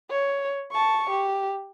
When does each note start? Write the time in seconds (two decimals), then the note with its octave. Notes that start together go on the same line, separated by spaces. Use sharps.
0.10 C#5
0.71 A5 C#6
1.10 G4